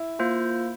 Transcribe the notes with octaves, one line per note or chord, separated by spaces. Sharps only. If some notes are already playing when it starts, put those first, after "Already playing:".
Already playing: E4
A#3 F4 C5